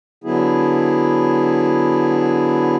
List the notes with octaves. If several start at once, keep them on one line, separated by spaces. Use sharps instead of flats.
D3 F#3 B3 E4 G#4